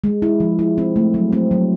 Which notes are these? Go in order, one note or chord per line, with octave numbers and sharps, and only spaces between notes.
G#3
E4
F3
E4
C4
A3
F#3
C4
F#3